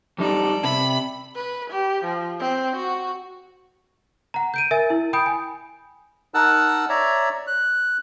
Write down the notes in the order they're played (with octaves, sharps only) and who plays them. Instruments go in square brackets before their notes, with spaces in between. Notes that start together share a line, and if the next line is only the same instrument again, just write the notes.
[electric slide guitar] F2 G3 D#4 [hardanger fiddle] A4 D5
[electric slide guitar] C3 [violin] B5
[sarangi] B4
G4
F3
C4
F#4
[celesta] F#5 A#5
G6 D7 D#7
A#4 E5 G#5 A6
E4
G5 B5 D#6 G6 D7
G#5
[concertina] D#4 A#4 F#5 A5 E6 F#6
C#5 D5 E5 A#5
F#6